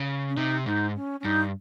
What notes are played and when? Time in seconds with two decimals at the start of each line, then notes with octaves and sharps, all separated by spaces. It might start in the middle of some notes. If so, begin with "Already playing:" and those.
Already playing: C#3
0.29 C#4
0.36 C3 D#4
0.66 G#2 D#4
0.95 C#4
1.20 C#4
1.24 G2 D#4